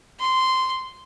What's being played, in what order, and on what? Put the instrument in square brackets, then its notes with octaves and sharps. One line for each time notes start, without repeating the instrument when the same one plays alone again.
[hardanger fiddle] C6